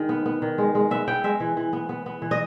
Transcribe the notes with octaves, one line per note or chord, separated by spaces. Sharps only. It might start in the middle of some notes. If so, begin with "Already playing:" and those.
Already playing: D#3 G#3
B3
B3
D#3
G#3
G#3
B3 E5
B3 G5
G#3 E5
E3
E3
B3
B3
B3
E3
D#5